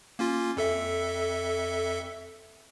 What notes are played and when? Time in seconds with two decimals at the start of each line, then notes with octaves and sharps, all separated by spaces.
0.19 A#3 C#4 F4
0.57 F2 A4 E5